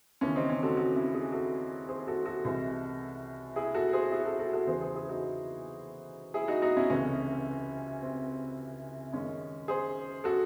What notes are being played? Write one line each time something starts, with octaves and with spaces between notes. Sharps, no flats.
D#2 C#3 E3 C#4
C4 D#4
C#4
F#4 A4
F#4 A4
C#4 E4
E4 G#4
F#4 A4
G#4 C5
F#4 A4
F#4 A4
C2 C3 E3 G#3
E4 G#4
F#4 A4
G#4 C5
E4 G#4
F#4 A4
F#4 A4
F#4 A4
E2 C#3 E3 G#4 C5
G#4 C5
E4 G#4
D#4 F#4
E4 G#4
D#4 F#4
D#4 F#4
C#4 E4
C#2 C3 E3 A3 C#4
C4
F#2 D#3 G#3 C#4
G#4 C5
F#4 A4